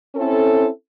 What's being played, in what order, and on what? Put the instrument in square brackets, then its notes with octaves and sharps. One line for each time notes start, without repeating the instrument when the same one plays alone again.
[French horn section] C4 C#4 E4 A4